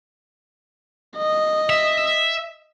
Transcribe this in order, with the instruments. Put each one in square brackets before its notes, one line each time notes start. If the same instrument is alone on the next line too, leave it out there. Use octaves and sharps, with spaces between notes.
[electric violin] D#5
[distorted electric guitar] E5